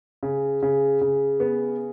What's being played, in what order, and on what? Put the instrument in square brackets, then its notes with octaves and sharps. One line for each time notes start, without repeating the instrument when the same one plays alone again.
[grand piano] C#3
C#3
C#3
B3